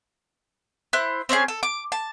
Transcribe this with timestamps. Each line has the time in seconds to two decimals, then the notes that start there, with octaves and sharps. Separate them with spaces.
0.93 E4 C5 F#6
1.29 C4 C#4 D#4 G#4
1.48 A4
1.63 D6
1.92 A5